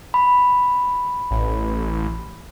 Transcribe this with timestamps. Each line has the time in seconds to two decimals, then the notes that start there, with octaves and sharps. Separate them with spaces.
0.14 B5
1.31 A1